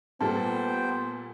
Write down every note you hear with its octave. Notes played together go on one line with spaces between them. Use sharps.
A#2 G3 B3 A4 C5 G5 A5